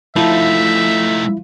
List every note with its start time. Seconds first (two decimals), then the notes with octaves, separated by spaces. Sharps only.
0.16 F3 A3 D#4 E4 E5